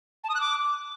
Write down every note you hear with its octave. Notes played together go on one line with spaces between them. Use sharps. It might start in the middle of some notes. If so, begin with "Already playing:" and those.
A5
D#6
F#6
D6